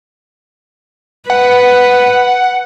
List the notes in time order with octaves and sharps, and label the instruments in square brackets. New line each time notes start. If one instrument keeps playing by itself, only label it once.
[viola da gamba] B4 [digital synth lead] F#5